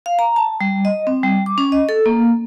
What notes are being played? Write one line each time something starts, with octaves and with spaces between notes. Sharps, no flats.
F5
A#5
A5
G3
D#5
C4
G3
D6
C#4
D#5
A4
A#3